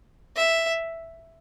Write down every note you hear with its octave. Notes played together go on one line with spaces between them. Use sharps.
E5